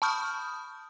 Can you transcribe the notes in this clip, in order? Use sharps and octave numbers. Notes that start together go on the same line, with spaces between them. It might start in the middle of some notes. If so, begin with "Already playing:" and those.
A5 B5 C#6 D#6 F6 G6